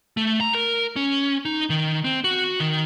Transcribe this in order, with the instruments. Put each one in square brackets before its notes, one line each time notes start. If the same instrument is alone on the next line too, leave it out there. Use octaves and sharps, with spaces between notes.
[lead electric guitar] A3
A#5
A#4
C#4
D#4
D#3
C4
F#4
D#3